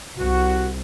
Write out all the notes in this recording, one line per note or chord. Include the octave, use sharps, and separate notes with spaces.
C2 F#4